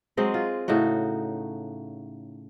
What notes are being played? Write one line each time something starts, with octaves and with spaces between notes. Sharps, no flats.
F#3 G#3 C4 D#5
F4
A2 C#3 D#4 F#4